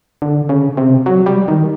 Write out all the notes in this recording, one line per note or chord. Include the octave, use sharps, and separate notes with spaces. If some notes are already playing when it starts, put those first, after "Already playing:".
D3
C#3
C3
F#3
G3
D#3